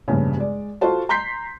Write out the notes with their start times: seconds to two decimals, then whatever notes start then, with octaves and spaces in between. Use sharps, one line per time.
0.08 F1 A#1 G2 C#3
0.37 G#3 D5
0.81 F4 F#4 A4 C5 A5
1.09 A#5 C6 G6 B6 C7